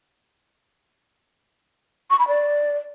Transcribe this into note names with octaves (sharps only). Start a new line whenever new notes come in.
C#6
B5
D5